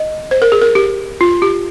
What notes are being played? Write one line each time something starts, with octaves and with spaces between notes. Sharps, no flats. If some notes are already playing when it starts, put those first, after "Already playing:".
Already playing: D#5
C5
A#4
G#4
A#4
G4
F4
G4